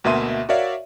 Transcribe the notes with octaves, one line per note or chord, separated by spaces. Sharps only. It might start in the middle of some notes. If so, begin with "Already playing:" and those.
D2 B2 A#3 E5 C6 D#7
F#4 A#4 C#5 D5 E5 F5